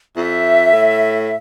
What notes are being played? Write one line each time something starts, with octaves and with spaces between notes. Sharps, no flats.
F2 E5
A2